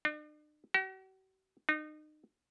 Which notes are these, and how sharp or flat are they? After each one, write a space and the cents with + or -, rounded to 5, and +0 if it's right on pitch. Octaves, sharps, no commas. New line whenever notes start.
D4 +45
F#4 +45
D#4 -30